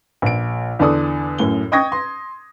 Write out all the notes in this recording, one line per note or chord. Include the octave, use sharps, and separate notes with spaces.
A#1 D7
E2 D3 A4 D5 D#6
F#2 A2 G7
D#5 G5 C#6 D#6 G#6 A#6
C6